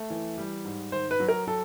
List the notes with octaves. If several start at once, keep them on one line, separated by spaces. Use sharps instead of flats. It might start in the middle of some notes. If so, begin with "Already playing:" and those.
Already playing: A3
E3
G3
G#2
D#3 C5
B4
F#3
A#4
F#3 A4